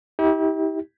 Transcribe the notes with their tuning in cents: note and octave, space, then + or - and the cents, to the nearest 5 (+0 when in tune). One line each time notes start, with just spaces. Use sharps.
E4 -45 G4 +0